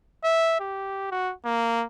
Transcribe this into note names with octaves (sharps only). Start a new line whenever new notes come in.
E5
G4
F#4
A#3